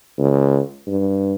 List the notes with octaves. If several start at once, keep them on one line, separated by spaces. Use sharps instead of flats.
C#2
G2